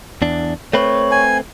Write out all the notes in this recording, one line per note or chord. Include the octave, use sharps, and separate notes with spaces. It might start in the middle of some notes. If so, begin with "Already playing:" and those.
E2 D4
A3 C4 B4 C#5
G#5